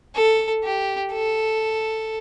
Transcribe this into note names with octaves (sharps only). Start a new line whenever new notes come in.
A4
G4
A4